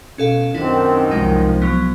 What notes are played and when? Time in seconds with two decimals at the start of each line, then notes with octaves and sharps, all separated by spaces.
0.18 B2 C#4 A4 F5
0.54 F#2 D#3 C4 D4 E4
1.11 C2 F3 G#3 D#4
1.62 F#3 B3